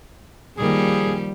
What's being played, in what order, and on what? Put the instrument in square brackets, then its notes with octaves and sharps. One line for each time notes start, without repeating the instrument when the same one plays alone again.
[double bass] D#3 A#3 [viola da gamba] F3 G3 [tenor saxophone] G#4